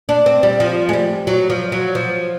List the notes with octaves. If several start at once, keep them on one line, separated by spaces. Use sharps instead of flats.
D4
C4
G3
F3
G#3
G3
F#3
F3
F#3
F3